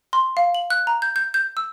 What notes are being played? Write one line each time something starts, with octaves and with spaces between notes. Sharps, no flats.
C6
F5
F#7
F#6
A#5
G6
G6
G6
E6